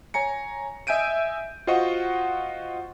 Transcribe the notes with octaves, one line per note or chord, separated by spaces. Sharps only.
C#5 G#5 A#5 C#7
D#5 E5 G#5 G6 D7 D#7
F4 F#4 C5 D#5 F#5 C#6